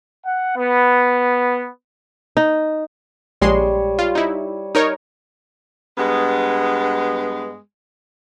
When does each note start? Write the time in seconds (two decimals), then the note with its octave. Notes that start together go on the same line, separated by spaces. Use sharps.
0.24 F#5
0.56 B3
2.37 D#4
3.41 A#1 G3 G#3 C#5 C6
3.99 F4
4.15 D#4 E4
4.75 D#4 A#4 C#5
5.98 G2 G#3 B3